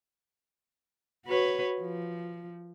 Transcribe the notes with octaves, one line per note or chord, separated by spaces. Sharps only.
F#4 B4 C#5
F3